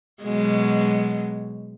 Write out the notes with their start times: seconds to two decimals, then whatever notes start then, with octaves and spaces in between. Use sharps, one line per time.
0.23 B2 F#3 G#3